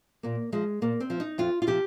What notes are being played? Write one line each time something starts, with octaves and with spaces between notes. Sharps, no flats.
A#2 A#3
F3 G#3
A#2 A#3
C4
F3
D#4
F2 F4
F4
C3 F3 G4